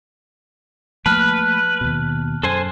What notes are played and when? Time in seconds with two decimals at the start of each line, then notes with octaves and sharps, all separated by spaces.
1.06 F3 A3 A#3 B4 A5 F6 F#6
1.81 D#2 B2
2.43 F#2 A4 C5 G#5